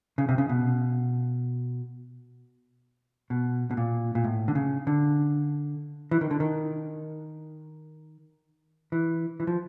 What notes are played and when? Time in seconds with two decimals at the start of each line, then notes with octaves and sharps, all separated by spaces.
0.18 C#3
0.29 C3
0.38 C#3
0.49 B2
3.30 B2
3.71 B2
3.77 A#2
4.15 A#2
4.24 A2
4.48 D3
4.55 C#3
4.87 D3
6.11 E3
6.21 D#3
6.31 D3
6.40 D#3
8.92 E3
9.40 E3
9.47 F3